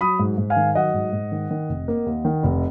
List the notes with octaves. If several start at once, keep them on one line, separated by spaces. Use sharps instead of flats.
F#3 B5 D#6
G#2
G#2
F5 G#5
D#3
F#3 D#5 F#5
G#2
G#2
D#3
D#3
F1
A#3
D#2
D#3
F1